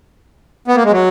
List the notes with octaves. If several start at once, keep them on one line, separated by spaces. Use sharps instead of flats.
B3
A#3
G#3
F#3